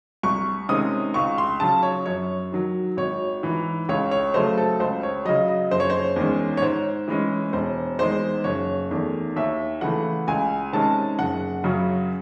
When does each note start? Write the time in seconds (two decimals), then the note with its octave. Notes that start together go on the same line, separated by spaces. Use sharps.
0.23 C2 C#6
0.69 C3 D#3 G#3 C#4 D#6
1.14 C#2 C#6
1.38 C6
1.60 C#3 F#3 C#4 A5
1.83 C#5
2.06 F#2 C#5
2.52 D#3 F#3
2.97 G#1 C#5
3.43 G#2 E3
3.89 C#2 C#5
4.11 C#5
4.34 C#3 F#3 A3 C5
4.58 A4
4.80 C#2 C5
5.03 C#5
5.25 C#3 F#3 D#5
5.48 D#5
5.71 F#1 C5
5.80 C#5
5.90 C5
6.16 E2 D#3 G#3 C#4
6.57 C#5
6.62 G#2 C5
7.08 E3 G#3 C#4
7.53 E1 C5
7.99 E2 D#3 G#3 C5
8.44 F#1 C#5
8.91 E2 D#3 A3
9.36 D#2 E5
9.81 C#3 E3 A3 F#5
10.28 C#2 G#5
10.73 C3 D#3 G#3 C#4 A5
11.19 F#1 F#5
11.64 F#2 C#3 F#3 C#4